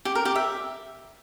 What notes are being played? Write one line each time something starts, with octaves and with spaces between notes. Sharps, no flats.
G4
A#4
G4
E5